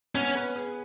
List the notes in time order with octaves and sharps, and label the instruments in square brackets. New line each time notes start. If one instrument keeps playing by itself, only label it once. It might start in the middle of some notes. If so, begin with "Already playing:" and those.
[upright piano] B3 [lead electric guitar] C#4
[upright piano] B4
G#4